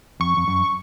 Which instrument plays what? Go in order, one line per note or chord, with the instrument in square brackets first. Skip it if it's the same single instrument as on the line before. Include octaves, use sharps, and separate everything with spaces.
[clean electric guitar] F2 [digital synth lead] C#6
[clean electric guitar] F2
F#2